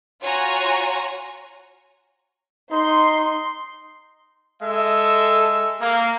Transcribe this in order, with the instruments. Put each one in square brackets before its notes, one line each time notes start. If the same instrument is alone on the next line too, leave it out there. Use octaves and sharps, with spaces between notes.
[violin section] F4 F#4 C#5 G#5 A#5
[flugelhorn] D#4 [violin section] C6
[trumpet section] G#3 A4 E5
A#3